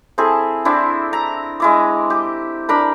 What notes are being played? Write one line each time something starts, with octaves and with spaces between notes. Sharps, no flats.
C4 E4 G#4 A4
C4 D4 E4
A#5
G#3 E4 D6
G4
D4 A#4 B5